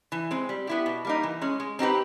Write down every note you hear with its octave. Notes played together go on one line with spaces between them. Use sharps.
E3
G#3 C4
G3
B3 E4 G4
B2
G3 A#3 D#4
E3
G#3 C#4
G#3
C4 D#4 G4 B4